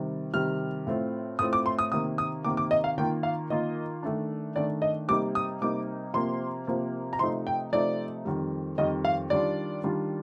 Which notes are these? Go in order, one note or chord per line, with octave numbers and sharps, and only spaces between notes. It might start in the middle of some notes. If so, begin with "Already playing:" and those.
Already playing: C3 D#3 G3
C3 D#3 G3 F6
A2 A3 C4 F4
A2 A3 C4 F4 D#6
D6
C6
D#6
C3 D#3 A#3 D#6
D#6
C3 D#3 A#3 D6
D6
D#5
F5
D#3 A#3 F4 G5
F5
D#3 A#3 F4 D#5
D#3 A3 D4
D#3 A3 D4 D5
D#5
C3 G3 A#3 D#4 D6
D#6
C3 G3 A#3 D#4 D6
C3 F3 A#3 C6
C3 F3 A#3
A#5
C3 F3 A3 D#4 C6
G5
C3 F3 A3 D#4 D5
F2 D#3 G3
F2 D#3 G3 D#5
F5
D#3 G3 D4 F4 D5
D#3 G3 D4 F4